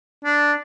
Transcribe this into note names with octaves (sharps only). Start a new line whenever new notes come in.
D4